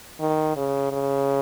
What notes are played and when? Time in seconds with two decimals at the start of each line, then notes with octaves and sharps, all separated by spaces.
0.20 D#3
0.56 C#3
0.92 C#3